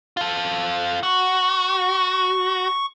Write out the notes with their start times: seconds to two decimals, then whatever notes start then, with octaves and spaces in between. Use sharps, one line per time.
0.17 F4 A4
1.03 F#4 C#6